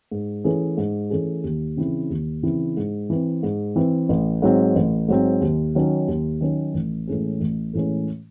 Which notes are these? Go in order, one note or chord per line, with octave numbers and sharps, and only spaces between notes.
G#2
E3 A3 C#4 G#4
G#2
E3 A3 C#4 G#4
D#2
C#3 E3 C4 E4
D#2
C#3 E3 C4 E4
G#2
E3 C4
G#2
E3 C4
A1
G#2 F#3 C4
A1
G#2 F#3 C4
D#2
D#3 F#3 C#4
D#2
D#3 F#3 C#4
A1
A2 E3 G#3 C#4
A1
A2 E3 G#3 C#4